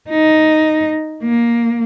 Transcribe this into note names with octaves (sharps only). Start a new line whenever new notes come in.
D#4
A#3